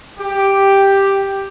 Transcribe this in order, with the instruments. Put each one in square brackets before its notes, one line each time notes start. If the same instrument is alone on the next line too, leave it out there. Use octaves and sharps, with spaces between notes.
[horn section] G4